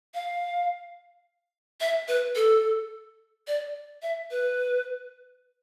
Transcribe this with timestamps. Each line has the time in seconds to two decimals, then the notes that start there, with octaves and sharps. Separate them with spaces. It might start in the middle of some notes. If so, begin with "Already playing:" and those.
0.14 F5
1.81 E5
2.08 B4
2.36 A4
3.48 D5
4.02 E5
4.31 B4